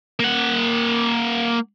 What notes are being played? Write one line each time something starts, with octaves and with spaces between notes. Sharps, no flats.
A#3 F#5